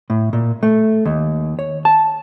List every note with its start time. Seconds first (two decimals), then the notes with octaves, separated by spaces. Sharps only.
0.10 A2
0.33 A#2
0.63 A3
1.05 D#2
1.59 C#5
1.85 A5